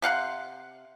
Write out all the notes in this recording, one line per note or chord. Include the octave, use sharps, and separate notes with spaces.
C3 F5 F#5 C6